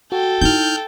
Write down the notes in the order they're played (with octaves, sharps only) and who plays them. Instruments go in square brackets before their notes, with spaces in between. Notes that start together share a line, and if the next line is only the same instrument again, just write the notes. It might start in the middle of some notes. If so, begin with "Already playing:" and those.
[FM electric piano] F#4 [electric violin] A4 G5
[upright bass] D#4 E4 [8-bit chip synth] F6 G6